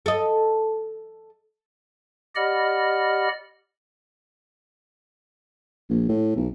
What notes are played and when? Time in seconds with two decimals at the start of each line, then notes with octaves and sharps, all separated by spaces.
0.06 A4 D#5
2.36 G4 D5 D#5 F#5 B5 F6
5.90 A#1
6.09 A2
6.36 B1